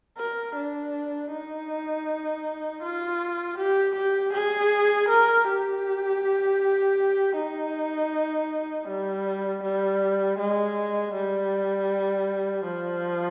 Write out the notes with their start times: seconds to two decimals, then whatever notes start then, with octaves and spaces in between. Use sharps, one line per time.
0.18 A#4
0.56 D4
1.31 D#4
2.83 F4
3.58 G4
3.96 G4
4.33 G#4
5.09 A#4
5.47 G4
7.36 D#4
8.88 G3
9.63 G3
10.39 G#3
11.14 G3
12.65 F3